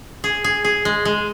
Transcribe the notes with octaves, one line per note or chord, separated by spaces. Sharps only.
G#4
G#4
G#4
G#3
G#3